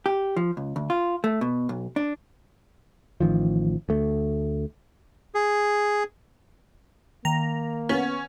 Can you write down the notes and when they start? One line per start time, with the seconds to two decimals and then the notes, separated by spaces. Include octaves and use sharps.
0.06 G4
0.37 F3
0.57 C#2
0.76 D2
0.90 F4
1.24 A3
1.41 B2
1.69 B1
1.96 D4
3.21 A1 D#3 F3
3.89 D2 A3
5.35 G#4
7.25 D#3 A#3 A#5
7.89 B3 C#4